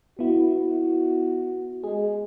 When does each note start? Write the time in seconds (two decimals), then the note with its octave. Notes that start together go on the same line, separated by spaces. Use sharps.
0.19 B3 E4 F#4
1.84 G#3 G#4